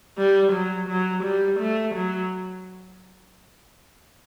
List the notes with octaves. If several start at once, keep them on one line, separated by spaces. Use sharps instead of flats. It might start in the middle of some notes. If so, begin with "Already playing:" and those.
G3
F#3
F#3
G3
A3
F#3